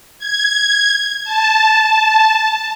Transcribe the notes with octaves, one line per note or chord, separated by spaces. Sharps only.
G#6
A5